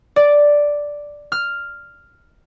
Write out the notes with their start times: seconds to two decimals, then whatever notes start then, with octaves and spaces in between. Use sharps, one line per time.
0.16 D5
1.32 F6